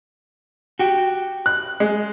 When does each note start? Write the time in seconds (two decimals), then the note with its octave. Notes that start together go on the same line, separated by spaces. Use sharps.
0.79 F#4 G4
1.46 F#6
1.80 G#3